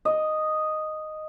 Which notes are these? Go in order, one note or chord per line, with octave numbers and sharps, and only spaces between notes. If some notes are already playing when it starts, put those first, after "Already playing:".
D#5